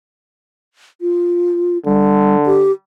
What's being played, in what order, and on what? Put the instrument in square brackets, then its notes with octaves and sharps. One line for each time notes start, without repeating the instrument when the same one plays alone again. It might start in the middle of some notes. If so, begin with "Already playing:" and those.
[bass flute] F4
[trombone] D3 [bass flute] G3
[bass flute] G4